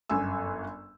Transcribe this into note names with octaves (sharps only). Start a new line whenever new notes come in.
G1 F#2 G#5 E6